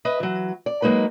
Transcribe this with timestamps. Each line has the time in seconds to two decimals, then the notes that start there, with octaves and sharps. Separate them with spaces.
0.05 B4 D#5 E5
0.20 E3 F#3
0.66 D5
0.82 F#3 G#3 A#3 D#4 B4